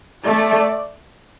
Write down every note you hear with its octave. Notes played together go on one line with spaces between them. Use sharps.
A3 D5